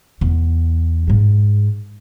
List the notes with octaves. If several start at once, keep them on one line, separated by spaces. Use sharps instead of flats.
E2
G#2 G#3